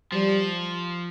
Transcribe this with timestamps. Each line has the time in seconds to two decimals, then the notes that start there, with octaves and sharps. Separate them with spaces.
0.12 F3 G3